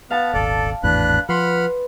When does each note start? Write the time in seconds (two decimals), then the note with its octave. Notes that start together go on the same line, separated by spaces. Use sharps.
0.11 B3 F5 A5
0.34 D#1 G#1 A4 D5
0.83 G#1 E2 A2 D4 B4 F#6
1.29 F3 B4 F#5 B5 C6 F6